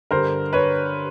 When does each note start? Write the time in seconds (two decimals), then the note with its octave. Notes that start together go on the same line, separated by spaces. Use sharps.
0.11 G2 D3 A#4 C5
0.53 B4 C#5